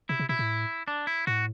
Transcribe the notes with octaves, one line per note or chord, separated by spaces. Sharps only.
C3 E4
C3
B2 E4
A2
D4
E4
A2 F#4